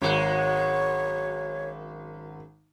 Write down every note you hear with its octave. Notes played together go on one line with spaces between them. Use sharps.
G#1 F#2 G#3 F#4 C#5